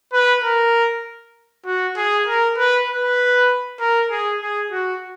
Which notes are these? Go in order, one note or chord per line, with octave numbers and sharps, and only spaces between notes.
B4
A#4
F#4
G#4
A#4
B4
B4
A#4
G#4
G#4
F#4